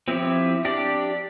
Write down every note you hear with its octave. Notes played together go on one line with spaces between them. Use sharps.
F3 C4 E4 G4
D4 G4 D5